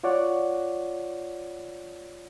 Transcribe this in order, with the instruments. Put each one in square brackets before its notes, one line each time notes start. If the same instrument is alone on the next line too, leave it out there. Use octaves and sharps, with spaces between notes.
[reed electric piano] F4 C#5 D5 F#5